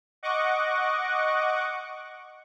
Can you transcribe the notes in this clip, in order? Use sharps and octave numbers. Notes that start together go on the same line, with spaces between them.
D#5 F#5 C#6 D6